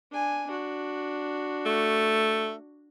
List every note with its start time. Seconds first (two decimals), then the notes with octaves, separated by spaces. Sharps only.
0.11 D4 G#5
0.46 D4 F#4
1.66 A3